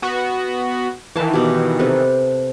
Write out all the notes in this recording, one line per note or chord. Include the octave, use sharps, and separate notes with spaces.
B3 F#4
D#3 E3 F5 A5
B2 G4
C3 A4 B4